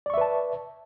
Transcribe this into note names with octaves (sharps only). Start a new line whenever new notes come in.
B4 D5 E5 A5 C#6